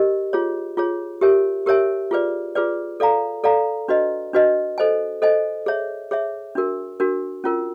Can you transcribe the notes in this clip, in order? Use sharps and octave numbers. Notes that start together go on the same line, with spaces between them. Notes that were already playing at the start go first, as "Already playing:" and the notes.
Already playing: G4 A#4 D#5
F4 G#4 C#5
F4 G#4 C#5
G4 A#4 C#5 E5 G#5
G4 A#4 C#5 E5 G#5
F4 G#4 B4 D5
F4 G#4 B4 D5
A4 D5 F5 A#5
A4 D5 F5 A#5
D4 F#4 B4 D#5
D4 F#4 B4 D#5
A4 C5 D#5 G#5
A4 C5 D#5 G#5
G#4 C#5 E5
G#4 C#5 E5
D4 F#4 A#4
D4 F#4 A#4
C#4 F4 A#4